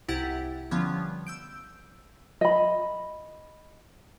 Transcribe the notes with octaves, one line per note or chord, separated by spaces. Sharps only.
C2 C3 E4 G4 F#5 A6
D3 F3 G3 B3 C#4
E6 G6 D7
D#5 B5